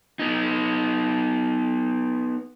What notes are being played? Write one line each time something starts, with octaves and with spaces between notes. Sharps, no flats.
B3 D#4